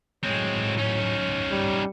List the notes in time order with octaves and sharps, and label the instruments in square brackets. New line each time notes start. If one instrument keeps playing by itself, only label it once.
[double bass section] A2 F#3 [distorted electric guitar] G#3 C4 [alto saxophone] C#5
[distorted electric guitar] C#4 D#4
[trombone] G3